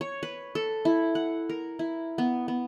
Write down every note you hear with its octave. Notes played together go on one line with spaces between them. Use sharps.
C#5
B4
A4
E4
F#5
A#4
E4
B3
B3